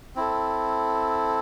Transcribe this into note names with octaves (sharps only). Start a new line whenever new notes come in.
C4 E4 A4